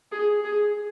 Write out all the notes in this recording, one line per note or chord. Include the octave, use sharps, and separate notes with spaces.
G#4
G#4